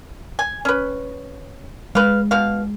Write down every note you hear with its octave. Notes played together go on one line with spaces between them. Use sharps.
G#5
C#4 B4
G#3 B4 F5
B2 F5